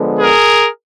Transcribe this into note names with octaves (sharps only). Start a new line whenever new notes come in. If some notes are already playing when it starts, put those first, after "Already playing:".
Already playing: D3 F3 G#3 B3
G#4 A#4